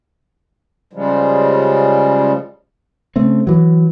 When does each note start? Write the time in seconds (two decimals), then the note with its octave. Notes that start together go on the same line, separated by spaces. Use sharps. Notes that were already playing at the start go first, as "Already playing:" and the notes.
0.93 C#3 F3 G3 G#3
3.16 C#3 A3 C4
3.47 E3 F#3